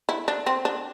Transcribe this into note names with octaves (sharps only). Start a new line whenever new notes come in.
E4
D4
C4
D4